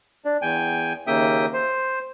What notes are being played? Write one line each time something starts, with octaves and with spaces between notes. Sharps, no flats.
D4
E2 G5 G#5
D#2 C#3 A#3 E5 G5 D#6
C5